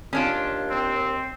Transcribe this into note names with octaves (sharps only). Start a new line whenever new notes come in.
D#2 C#4 D4 F4
C4